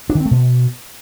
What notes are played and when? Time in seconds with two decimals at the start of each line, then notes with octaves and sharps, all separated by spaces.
0.10 D4
0.15 D#3
0.20 C4
0.26 A3
0.31 B2